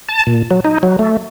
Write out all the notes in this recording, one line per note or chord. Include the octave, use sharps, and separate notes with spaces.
A5
A#2
F#3
D#4
F#3
A3